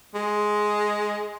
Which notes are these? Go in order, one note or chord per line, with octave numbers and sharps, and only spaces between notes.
G#3